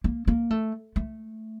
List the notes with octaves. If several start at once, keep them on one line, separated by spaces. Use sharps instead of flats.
A#3
A#3
A3
A3